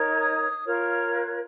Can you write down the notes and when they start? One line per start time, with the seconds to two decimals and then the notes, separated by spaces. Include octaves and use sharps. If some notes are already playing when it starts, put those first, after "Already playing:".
Already playing: D#4 A#4 C#5
0.19 D#6
0.65 F4 A#4 C#5 F6
0.89 F6
1.12 F#6